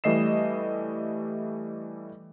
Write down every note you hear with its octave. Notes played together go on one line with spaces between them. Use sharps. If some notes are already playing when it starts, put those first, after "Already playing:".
E3 G3 A3 D#5 C7 E7